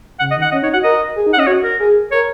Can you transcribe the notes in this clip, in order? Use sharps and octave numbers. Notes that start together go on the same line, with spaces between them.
C#3 F#5
D#5
D#3
F#5
C#4 D#5
D#4 C#5
F#4 F#5
A#4 D#5
G#4
D#4
F#5
C#4 D#5
F#4 C#5
A#4
G#4
A#4 C#5